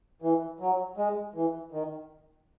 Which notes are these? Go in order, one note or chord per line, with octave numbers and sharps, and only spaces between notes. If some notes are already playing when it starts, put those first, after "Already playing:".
E3
F#3
G#3
E3
D#3